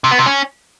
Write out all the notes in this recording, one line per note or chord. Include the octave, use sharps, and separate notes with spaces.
C3
B3
C3
C#4